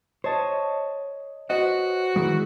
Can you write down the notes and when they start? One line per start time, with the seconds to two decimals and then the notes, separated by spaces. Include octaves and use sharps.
0.24 C5 C#5 D#5 A5
1.50 F#4 B4 C5 D#5
2.16 D#3 E3 G#3 E4